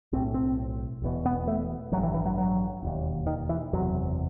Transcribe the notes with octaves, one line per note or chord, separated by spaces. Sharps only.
B1 A2 C4
C4
E1 E2 B2
B3
A3
A1 G2 F#3
E3
E3
F#3
F#3
E1 D#2
D#3
E3
F#1 E2 C3 F#3